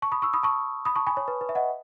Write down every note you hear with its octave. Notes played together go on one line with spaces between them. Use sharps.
A5 C#6
B5 D#6
C#6 E6
B5 D#6
A5 C#6
B5 D#6
A5 C#6
G#5 B5
C#5
B4
B4
E5
D#5 F#5